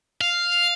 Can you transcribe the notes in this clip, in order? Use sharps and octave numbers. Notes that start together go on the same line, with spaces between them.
F5